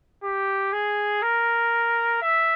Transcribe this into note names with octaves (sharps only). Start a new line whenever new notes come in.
G4
G#4
A#4
E5